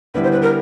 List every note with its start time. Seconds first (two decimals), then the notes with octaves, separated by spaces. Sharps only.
0.14 D3 G3 B3 E4 B4
0.23 C5
0.32 B4
0.42 A#4